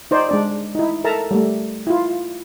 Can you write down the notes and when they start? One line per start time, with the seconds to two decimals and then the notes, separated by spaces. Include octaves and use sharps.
0.11 D#4 C5 D5
0.29 G#3 D4 D5
0.75 D#4 E4
1.04 A4 A#4 E5 A5 A#5
1.31 G3 A3
1.87 E4 F4